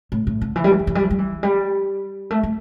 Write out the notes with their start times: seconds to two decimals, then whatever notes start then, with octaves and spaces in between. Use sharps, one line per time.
0.12 A2
0.27 A2
0.41 D3
0.56 E3
0.64 G3
0.72 E3
0.79 G3
0.87 E3
0.95 G3
1.03 E3
1.11 G3
1.18 E3
1.43 G3
2.31 A3
2.43 A3